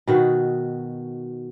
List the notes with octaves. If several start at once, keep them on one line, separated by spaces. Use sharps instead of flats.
B2 D#3 F#4